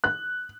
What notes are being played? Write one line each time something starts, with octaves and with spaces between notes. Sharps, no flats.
F#6